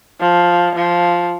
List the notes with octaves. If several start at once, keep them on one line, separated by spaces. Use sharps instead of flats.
F3
F3